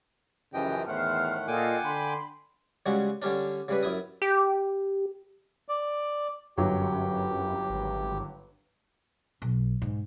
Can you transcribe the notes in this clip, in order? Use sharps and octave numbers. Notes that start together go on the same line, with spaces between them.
F#2 C#3 E3 F3 G4 D#5 G5
E2 A2 D#3 A3 C5 F#5 F6
A#2 F4 A4 D#5 G5 G#5 D6
D3 B5 C6
C#3 G3 G#3 F#4
D3 G3 C#4 D4
C#3 G3 B4
F#2 E4 D#6
G4
D5
G1 F#2 F#3 G4 C#5
G#1
B1
G#2